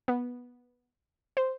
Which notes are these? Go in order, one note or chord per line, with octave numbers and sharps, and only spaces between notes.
B3
C5